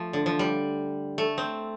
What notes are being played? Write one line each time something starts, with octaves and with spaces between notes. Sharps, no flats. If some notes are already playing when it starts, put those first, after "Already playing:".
Already playing: F3 A3
D3
F3
G3
A3
C4